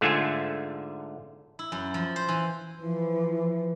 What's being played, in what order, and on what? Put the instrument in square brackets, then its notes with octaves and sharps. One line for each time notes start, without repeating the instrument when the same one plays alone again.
[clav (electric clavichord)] G#2 D3 A3 F4 E5 G#5
[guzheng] E4
F#2
F3
C5
E3
[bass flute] E3 [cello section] F3 [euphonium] B4